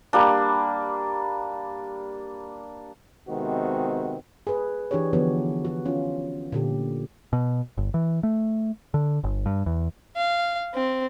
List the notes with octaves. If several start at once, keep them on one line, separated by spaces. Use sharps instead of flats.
G3 A#3 D4
C3 D#3 G#3 B3 C4 F#4
G#4 B4
E3 D4 G4 G#4 C#5
D3 E3 F3 B3 G4 C#5
F#4
C#4 F4
A#2 D3 G4
B2
G1
E3
A3
D3
G1
G2
E2
F5
C4